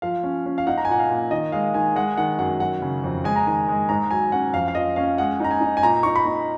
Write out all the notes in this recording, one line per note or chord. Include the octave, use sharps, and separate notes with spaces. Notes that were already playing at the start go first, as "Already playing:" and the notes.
F3 F5
C#4
C#4
F5
D#4 F#5
A#5
G#5
A#2 F#5
F5
A#2
D#3 D#5
G#3 F5
D#3 G#5
G#3 F#5
D#3 F#5
F#2 F#5
F#3 F#5
C#3
F2
G#3 G#5
A#5
D#3 G#5
G#3
G#2 A#5
F#3 G#5
C#4 F#5
F2 F5
F5
F3 D#5
C#4 F5
G#3 F#5
D#4 A#5
G#5
D#4
G#5
A#2 A#5
D#4 C#6
B5
D#4